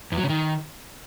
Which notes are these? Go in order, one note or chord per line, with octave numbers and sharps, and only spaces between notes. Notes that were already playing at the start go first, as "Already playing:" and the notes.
E2
F#3
C#3
D#3